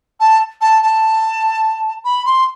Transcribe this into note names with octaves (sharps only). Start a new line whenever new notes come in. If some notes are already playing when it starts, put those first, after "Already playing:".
A5
A5
A5
B5
C6